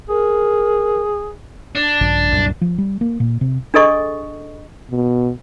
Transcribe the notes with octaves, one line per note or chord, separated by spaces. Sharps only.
G#4 A#4
D4
A#1 G2 C#3
C2 F#2 A#2
F3
G3
A#3
A#2
C3
D4 G#4 A4 D#5 C#6
B2